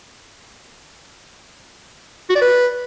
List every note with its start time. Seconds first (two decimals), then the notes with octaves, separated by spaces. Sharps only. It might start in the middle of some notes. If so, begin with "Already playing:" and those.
2.30 F#4
2.36 D5
2.42 B4